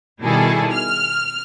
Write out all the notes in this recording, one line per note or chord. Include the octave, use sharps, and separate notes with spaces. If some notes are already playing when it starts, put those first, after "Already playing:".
B2 D#3 G3 E4 G#4 A4
F6